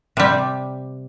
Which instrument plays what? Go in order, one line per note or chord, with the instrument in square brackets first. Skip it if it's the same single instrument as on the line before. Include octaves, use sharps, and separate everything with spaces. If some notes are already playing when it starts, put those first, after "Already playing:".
[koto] C3 G3